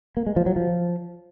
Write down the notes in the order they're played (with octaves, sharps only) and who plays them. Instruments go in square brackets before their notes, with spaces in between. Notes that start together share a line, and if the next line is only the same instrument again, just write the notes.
[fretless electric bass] A#3
G#3
F3
F#3
F3